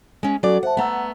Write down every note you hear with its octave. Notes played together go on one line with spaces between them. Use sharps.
G#3 C#4
F#3 C#4 F#4 A4 D5 D6
C5 E5 F#5 A5
A3 B3 F#5 A#5 E6